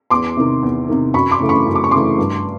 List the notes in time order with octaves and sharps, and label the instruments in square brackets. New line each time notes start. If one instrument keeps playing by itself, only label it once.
[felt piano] E2 C6 D6
C3 D#3
E2
C3 D#3
F#2 B5 C#6
C6 D6
C#3 E3 A3
B5 C#6
F#2
D6
C#6
C#3 E3 A3 C6 D6
G2